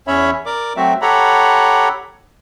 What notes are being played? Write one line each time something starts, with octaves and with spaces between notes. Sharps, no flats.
E2 C#4 C#5 E5 B5
A#4 D5 D6
F#3 A3 C4 F#4 E5
G4 A4 C#5 F#5 A#5 B5